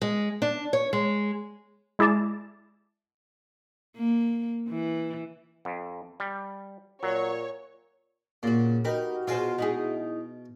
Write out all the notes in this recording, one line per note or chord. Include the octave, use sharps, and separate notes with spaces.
G#3
D4
C#5
G#3
G#3 E4 G#4 D5 A5
A#3
E3
F2
G3
A#2 F#3 C#5
A#2 C#3 F#4
D#4 F#4 G4 A#4 B4
B2 F4 G#4 C5 F5
D#4 E4 G#4